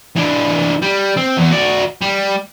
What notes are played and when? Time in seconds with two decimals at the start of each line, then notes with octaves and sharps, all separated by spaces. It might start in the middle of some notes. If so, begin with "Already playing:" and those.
0.16 E3 D4
0.82 G3
1.17 C4
1.38 E2
1.51 F#4 D5
2.02 G3